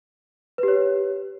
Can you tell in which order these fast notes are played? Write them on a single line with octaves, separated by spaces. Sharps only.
B4 G4 C#5